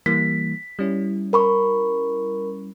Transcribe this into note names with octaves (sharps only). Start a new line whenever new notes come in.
E3 G3 A#3 B6
G3 C#4 E4
A#4 B5 C#6